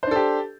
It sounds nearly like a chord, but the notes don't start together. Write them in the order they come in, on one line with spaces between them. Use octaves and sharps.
C5 D4 A4 G4